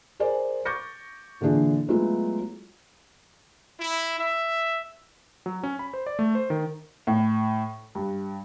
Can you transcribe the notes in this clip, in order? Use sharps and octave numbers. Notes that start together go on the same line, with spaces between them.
G#4 A#4 C5 D5 G#5
C#6 D6 G6 A6 A#6 C#7
A#2 D3 E3 D4 G#4
F#3 G#3 A3 B3 E4 F4
E4
E5
F#3
C#4
B5
C5
D5
A3
C5
D#3
A2
G2